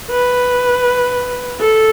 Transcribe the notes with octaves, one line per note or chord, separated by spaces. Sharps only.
B4
A4